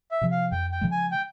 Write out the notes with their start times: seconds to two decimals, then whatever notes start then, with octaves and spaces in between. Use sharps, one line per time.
0.11 E5
0.21 C3 F3
0.31 F5
0.52 F2 G5
0.72 G5
0.81 C#3 F3 G#3
0.92 G#5
1.11 G5